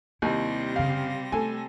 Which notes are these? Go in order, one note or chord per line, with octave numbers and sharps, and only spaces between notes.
D#2 C3 G3 E4 A#6
F#1 C#3 F5
A3 A4 G#5